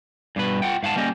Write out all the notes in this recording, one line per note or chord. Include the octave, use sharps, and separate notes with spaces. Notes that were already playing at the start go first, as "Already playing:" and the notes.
G2 B2 B4
F4 F#5 G5
G#2 F5 F#5 A5
G3 A#3 C#4 G4 D#5